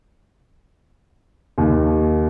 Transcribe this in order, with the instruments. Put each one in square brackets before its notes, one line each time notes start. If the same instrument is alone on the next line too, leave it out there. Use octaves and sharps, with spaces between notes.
[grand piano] D#2